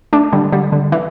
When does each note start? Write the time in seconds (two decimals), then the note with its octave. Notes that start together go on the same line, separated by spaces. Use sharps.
0.13 A3 D4
0.33 D3 G3
0.52 D3 G3
0.72 D3
0.92 E3